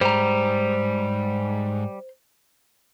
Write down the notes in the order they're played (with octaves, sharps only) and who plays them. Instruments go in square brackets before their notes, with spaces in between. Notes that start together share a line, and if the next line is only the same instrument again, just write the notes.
[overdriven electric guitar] G#2 [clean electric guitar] G3 [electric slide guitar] C5 A#5